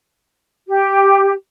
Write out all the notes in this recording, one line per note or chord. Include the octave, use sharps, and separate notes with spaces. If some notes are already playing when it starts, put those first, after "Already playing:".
G4